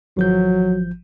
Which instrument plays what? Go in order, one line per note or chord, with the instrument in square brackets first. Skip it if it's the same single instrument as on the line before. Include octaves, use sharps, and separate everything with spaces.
[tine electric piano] G#1 F3 G6 [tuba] F#3